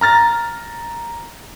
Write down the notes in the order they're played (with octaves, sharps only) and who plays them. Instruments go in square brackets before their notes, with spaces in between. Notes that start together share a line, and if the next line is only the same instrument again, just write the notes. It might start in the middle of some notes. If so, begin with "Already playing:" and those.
[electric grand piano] A#5 F6 A6 A#6